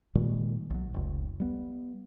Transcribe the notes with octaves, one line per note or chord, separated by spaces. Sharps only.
A#2 D#3 G3 G#3
B1 F#3
F1 C#2
G3 B3